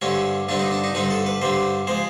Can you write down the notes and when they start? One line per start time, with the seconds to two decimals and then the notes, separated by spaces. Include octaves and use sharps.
0.02 G2 D3 G3 C4 C#4
0.49 G2 D3 G3 C4 D4
0.59 D#4
0.71 D4
0.84 D#4
0.94 G2 D3 G3 C4 D#4
1.10 A4
1.26 B4
1.42 G2 D3 G3 C4 C5
1.87 F3 G#3 C5